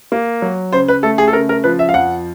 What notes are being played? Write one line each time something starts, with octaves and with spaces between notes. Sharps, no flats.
A#3
F#3
C#3 C5
B4
A3 A4
G#4
A4
C#3 A#4
A#4
F3 B4
E5
F5
F2 F#5